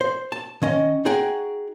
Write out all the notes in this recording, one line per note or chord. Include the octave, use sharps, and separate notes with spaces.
C5
A5
D#3 C#4 D#5
D#4 F#4 G#4 F#5 G5